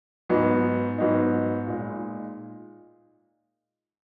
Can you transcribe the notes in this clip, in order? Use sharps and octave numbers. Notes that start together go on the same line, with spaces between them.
G#2 F#3 B3 D#4
G#2 F#3 B3 D#4
A#2 G#3 D#4